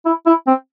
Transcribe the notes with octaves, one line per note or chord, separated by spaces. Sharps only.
E4
E4
C4